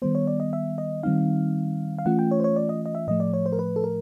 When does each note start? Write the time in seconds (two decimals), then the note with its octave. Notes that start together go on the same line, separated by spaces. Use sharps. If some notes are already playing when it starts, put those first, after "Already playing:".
0.02 D#3 G3 B3 C5
0.15 C#5
0.27 D5
0.40 D#5
0.53 E5
0.78 D#5
1.03 D#3 G3 C4 D#4 F5
1.98 F5
2.06 E3 A3 C#4 F4 F#5
2.19 G5
2.31 C#5
2.40 C5
2.44 C#5
2.56 D5
2.69 D#5
2.86 D#5
2.95 E5
3.08 A2 F3 A3 D#5
3.20 D5
3.33 C#5
3.46 C5
3.52 A#4
3.59 B4
3.76 A4
3.84 A#4